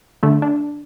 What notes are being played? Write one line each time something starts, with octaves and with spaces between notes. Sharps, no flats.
D3 A3
D4